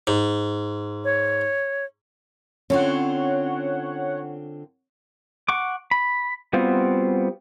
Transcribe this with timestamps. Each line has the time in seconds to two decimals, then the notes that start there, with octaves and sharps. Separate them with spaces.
0.07 G#2
1.04 C#5
2.70 D3 C4 C#4 F4 C#5 F#5
5.49 F#5 C#6 D6
5.91 B5
6.53 G3 B3 C4 F4 F#4